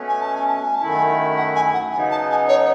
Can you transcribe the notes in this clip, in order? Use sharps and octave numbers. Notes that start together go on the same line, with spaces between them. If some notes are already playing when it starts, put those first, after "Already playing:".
Already playing: B2 A3 C#4
G#5
A5
G#5
A5
G#5
A5
F#2 D#3 A3 E4
G#5
F#5
G#5
F#5
C#3 F#3 B3 D#4 G#5
A5
G#5
C#5